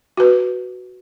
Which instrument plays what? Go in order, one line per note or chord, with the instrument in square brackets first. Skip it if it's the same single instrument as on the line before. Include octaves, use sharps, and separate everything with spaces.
[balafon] F#4 B4